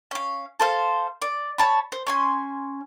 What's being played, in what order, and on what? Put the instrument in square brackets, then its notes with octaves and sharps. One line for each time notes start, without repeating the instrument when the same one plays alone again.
[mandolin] C#4 F5
A4 C5 F5
D5
C#5 A5 B5
C5
C#4 G#5 C6